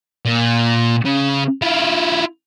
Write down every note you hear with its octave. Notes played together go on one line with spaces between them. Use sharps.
A#2
C#3
E4 F4